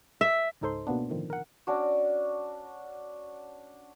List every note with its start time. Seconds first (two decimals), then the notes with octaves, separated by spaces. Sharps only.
0.21 E5
0.61 C#2 G#2 D#4 A4 C5 C6
0.87 B2 A#3 B3 D4
1.09 A2 D3 D#3 F3
1.30 A#4 F#5
1.67 C#4 D4 F#4